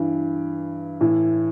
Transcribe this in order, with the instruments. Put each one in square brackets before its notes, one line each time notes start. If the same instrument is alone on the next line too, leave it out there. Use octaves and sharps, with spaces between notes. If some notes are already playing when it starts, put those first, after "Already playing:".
Already playing: [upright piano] G2 E3
A2 E3